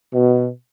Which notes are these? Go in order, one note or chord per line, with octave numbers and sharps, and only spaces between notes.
B2